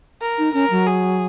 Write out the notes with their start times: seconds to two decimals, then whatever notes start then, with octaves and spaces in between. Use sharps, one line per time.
0.21 A#4
0.38 D#4
0.54 C#4 A#4
0.71 F#3
0.87 G#4